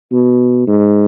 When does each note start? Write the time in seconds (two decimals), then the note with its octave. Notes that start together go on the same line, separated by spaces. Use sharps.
0.12 B2
0.67 G#2